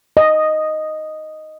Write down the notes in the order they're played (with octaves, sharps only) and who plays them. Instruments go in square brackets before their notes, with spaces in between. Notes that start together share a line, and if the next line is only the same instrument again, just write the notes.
[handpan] D#5